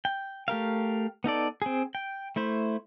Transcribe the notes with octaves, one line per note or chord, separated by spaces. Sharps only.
G5
A3 G4 A#4 F5
B3 D#4 A4 D5
C4 G#4
G5
A3 E4 C5